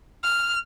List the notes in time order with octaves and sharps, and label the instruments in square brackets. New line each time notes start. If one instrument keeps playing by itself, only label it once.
[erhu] F6